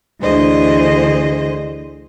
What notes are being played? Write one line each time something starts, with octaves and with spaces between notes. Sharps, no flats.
D2 D3 E3 G#4 C5 D#5